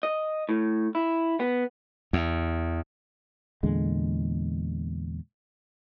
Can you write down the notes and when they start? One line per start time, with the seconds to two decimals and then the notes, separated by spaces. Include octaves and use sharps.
0.03 D#5
0.49 A2
0.95 E4
1.40 B3
2.13 E2
3.63 E2 A#2 D3 G#3